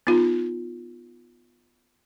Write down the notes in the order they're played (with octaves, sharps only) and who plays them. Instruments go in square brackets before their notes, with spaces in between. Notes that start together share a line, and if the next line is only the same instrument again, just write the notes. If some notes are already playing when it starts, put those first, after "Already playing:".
[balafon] B3 D#4 F4